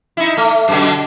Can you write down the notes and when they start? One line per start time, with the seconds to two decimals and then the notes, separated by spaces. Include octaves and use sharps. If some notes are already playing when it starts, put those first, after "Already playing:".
0.17 D#4 E4
0.37 A3
0.68 F#2 B2 D3